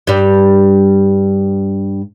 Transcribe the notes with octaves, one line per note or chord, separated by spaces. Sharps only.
G2 G3